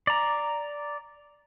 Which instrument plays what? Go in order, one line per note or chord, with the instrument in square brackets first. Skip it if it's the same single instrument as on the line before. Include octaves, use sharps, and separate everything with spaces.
[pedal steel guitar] D5 A#5